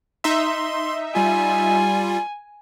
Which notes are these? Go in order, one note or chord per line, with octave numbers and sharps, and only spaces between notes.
D#4 E5 C6
G3 F4 G#5